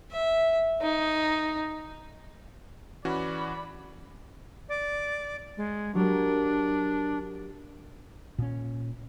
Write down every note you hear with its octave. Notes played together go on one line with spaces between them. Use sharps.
E5
D#4
E3 C#4 F#4 D5 B5
D5
G#3
F#3 D4 G4 A#4
A#2 C#4